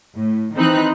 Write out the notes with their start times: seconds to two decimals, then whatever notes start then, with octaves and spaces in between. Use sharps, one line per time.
0.16 A2
0.55 D#3 E3 C4 D#4 B5 F#6